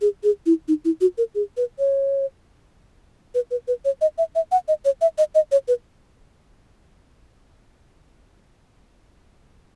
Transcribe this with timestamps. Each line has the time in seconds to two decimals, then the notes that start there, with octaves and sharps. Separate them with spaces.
0.02 G#4
0.24 G#4
0.46 E4
0.68 D#4
0.85 E4
1.01 F#4
1.18 A#4
1.35 G#4
1.57 B4
1.79 C#5
3.35 B4
3.51 B4
3.68 B4
3.85 C#5
4.01 D#5
4.18 E5
4.35 E5
4.52 F#5
4.68 D#5
4.85 C#5
5.01 E5
5.18 D#5
5.35 D#5
5.52 C#5
5.68 B4